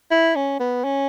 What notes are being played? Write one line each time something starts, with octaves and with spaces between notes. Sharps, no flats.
E4
C#4
B3
C#4